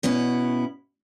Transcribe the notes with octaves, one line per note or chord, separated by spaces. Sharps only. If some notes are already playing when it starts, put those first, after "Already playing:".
B2 B3 C#4 E4